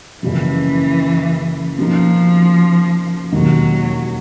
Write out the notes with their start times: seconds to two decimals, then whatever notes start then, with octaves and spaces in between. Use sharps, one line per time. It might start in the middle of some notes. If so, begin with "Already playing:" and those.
0.23 F#1 F#2 C#3 E3 F3
1.78 B2 F3 F#3 A#3 D#4
3.32 E1 D#2 D#3 F#3